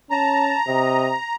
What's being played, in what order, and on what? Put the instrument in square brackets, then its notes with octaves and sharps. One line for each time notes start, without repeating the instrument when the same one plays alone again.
[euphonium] C#4 [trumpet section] A5 [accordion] A#5
[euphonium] C3 [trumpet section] D#5